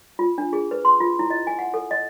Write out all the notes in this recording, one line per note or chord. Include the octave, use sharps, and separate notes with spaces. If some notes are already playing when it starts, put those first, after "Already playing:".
F4
D4
G#4
B4
C6
F4
E4
D#5
G#5
F#5
A4
D#5